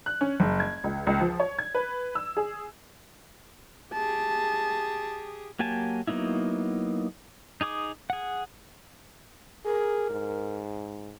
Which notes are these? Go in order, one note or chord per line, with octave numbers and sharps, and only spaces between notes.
F#6
C#4
F#1
G#6
C#2
C#2
F3
C#5
G#6
B4
E6
G#4
G4 G#4 A5
F#3 A#3 G4 G#5 A5
F#3 A#3 B3 D#4 E4
D#4 G#4 D6 D#6
G#4 F#5
G#4 A#4
G#2